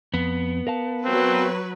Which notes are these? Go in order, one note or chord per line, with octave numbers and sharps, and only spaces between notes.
F2 B3
A#4 F5 A5
F#3 C4 B4